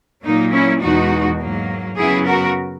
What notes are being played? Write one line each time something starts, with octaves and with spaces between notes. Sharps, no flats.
A#2 F#3 A#3 D#4
C#4 E4
E2 B2 G#3 D#4 F#4
G#2 F#3 A#3
F#2 C#3 F#3 B3 E4 G#4
F#4 A#4